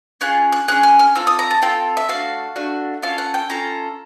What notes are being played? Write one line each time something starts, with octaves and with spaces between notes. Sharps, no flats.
C#4 F4 G#4 F#6
F#6
C#4 F4 G#4 F#6
F6
F6
C4 F4 A4 E6
D#6
A#5
A5
C4 F4 A4 G5
E5
A3 D4 F#4 F5
A3 D4 F#4
C#4 F4 A4 F5
F#5
G5
C#4 F4 A4 A#5